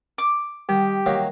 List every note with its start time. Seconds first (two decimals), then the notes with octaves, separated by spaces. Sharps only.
0.18 D6
0.69 D#3 G3 G4
1.06 D#3 F#3 A#3